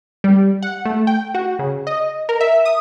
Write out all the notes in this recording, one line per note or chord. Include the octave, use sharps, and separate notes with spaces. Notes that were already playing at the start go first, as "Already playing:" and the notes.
G3
F#5
A3
G5
F#4
C#3
D#5
A#4
E5
D#6